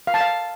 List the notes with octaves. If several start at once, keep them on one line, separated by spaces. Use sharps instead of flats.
F5
A5
F5